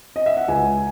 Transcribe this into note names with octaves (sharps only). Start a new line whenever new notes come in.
D#5
E5
F#5
C#2 G#5